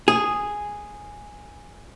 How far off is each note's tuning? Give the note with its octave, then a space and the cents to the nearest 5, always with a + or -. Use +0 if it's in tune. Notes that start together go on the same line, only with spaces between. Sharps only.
G#4 -5